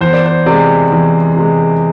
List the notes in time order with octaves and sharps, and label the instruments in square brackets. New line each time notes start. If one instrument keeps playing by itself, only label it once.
[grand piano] E2 C5
D5
C5
C3 G#3 D5
E2
C3 G#3